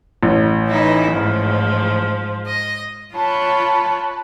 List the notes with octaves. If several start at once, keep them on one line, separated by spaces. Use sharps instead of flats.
A1
E3 D#4 E4
G#2 F3
D#5
F4 C#5 A5 B5 F#6